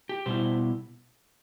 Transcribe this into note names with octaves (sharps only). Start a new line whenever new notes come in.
G4
B2 G3 B3 E4 C5